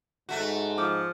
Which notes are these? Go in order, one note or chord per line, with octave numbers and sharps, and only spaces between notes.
G#2 A3 F#4 C6
F3 D6